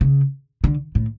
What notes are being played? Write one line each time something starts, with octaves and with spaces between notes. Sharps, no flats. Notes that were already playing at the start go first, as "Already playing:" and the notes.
C#3
D3
A2